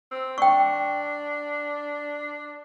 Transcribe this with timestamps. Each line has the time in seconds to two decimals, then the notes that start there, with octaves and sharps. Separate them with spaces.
0.12 C4
0.38 D4 G5 C#6